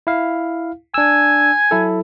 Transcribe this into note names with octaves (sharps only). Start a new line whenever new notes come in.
E4 F5
D4 G#5 E6
F#3 E4 A4